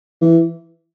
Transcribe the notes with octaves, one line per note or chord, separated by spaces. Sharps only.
E3